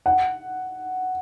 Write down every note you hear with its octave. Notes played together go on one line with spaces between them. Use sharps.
F#5